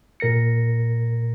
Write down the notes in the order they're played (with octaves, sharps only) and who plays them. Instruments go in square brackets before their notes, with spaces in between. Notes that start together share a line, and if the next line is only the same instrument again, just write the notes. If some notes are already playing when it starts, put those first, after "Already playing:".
[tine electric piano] A#2 A#4 A#6 C#7